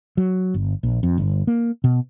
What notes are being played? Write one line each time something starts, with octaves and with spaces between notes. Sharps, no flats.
F#3
G1
A#1
F2
G1
A#3
B2